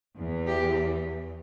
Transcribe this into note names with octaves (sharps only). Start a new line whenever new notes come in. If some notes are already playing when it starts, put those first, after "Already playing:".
E2 E3
G4